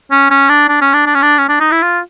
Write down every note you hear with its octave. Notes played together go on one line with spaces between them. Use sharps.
C#4
C#4
D4
D4
C#4
D4
D4
C#4
D4
C#4
D4
D#4
E4
F4